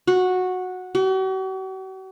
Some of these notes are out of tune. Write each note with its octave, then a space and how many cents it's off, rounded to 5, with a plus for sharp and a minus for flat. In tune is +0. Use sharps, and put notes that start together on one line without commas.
F#4 -10
F#4 +45